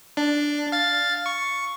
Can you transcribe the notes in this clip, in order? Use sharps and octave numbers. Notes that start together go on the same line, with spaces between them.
D4
F5 A6
C#6